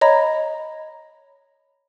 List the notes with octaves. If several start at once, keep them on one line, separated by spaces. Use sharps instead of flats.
C#5 D#5 A#5 B5